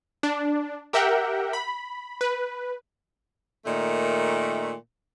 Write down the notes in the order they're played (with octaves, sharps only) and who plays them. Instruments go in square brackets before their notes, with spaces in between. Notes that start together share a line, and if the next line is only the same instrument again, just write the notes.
[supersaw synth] D4
G4 A#4 E5 F#5 G5
B5
B4
[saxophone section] A#2 D#3 A3